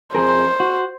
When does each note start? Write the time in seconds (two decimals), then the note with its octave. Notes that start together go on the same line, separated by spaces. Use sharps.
0.15 F2 G#4 A#4 C5
0.60 F#4